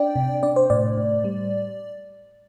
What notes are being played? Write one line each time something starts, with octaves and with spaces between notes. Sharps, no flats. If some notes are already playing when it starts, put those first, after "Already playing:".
Already playing: D4 D5 G5
C3
D4 D5
C5
A2 D5
A2
G3